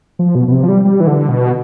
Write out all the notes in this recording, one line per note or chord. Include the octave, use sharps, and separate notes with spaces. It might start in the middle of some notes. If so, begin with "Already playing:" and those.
F3
B2
B2
C3
F3
G3
G3
E3
D3
B2